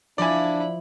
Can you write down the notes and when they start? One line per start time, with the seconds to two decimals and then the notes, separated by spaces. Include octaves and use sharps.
0.18 F3 D4 E4 D5 G#5